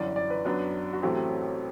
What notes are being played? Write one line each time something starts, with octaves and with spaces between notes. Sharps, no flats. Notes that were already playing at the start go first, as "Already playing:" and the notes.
Already playing: G1 F#2 E3 D5
D5
B4
F#2 F#3 B3 D4
F#4
A1 A2 F#3 A3 C4 G4